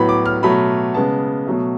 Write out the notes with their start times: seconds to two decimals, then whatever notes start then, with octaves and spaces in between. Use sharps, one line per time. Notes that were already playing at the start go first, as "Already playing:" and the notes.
Already playing: A2 F#3 B3 B5
0.09 D6
0.26 F6
0.43 B2 F#3 A3 B5
0.94 C#3 G#3 B3 A5
1.47 B2 F#3 A3